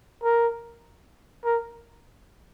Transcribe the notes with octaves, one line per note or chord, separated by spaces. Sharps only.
A#4
A#4